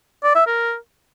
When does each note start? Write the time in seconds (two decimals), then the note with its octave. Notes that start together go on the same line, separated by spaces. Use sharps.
0.23 D5
0.35 E5
0.47 A#4